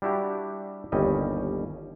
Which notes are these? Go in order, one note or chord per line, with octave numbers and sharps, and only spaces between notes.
G3 D4 E4 F#4 G4
G1 D#2 G3 C#4 D#5